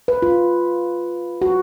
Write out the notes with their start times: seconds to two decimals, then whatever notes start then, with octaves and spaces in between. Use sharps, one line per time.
0.08 B4
0.22 F4
1.42 F#4